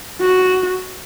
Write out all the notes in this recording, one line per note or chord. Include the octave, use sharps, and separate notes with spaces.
F#4